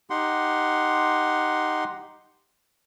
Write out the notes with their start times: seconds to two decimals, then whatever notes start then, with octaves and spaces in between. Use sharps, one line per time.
0.10 D#4 G4 F#5 C6